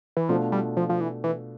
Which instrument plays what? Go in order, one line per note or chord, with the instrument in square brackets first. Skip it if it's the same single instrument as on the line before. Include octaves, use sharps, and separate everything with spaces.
[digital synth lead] E3
[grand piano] B2 A3 D4 F4 [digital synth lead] F3
[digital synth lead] G3
F3
F3
E3
E3